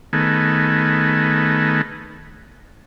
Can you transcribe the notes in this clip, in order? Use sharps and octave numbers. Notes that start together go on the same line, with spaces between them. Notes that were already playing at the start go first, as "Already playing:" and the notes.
D#3 A3 B3 G#4